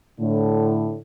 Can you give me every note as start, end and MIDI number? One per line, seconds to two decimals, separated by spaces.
0.19 0.97 45
0.19 0.97 50